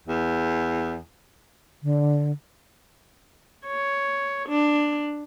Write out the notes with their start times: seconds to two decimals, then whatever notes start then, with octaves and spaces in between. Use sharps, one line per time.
0.07 E2
1.83 D3
3.66 C#5
4.49 D4